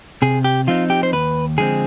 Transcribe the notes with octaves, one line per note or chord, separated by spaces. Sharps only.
C3 G#4
G4
F3 C4 D#4 F4
G4
C5
D#2 B4
D3 F3 G#3 C4 G#4